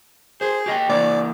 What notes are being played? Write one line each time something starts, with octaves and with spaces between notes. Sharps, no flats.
G#4 C5
G4 D#5 G5
E3 A#3 E4 D5